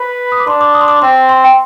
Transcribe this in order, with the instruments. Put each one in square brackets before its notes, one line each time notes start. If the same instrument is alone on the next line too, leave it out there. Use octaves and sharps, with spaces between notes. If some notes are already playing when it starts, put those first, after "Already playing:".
Already playing: [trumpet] B4 [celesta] B5
[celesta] D#6
D6
[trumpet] D4 [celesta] C6
[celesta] D6
D#6
C6
D6
[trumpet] C4 [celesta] C6
[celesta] C6
G5